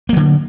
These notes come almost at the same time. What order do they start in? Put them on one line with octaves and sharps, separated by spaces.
A#3 F#3 D3